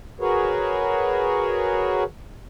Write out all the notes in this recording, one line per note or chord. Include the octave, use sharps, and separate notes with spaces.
F#4 G#4 A#4 B4 C#5